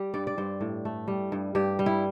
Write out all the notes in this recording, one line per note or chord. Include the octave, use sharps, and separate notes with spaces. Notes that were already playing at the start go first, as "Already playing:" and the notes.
Already playing: G3 G4
G2 D5
D5
G2 C5
A2
A3
G3
G2
G2 G4
G3
E4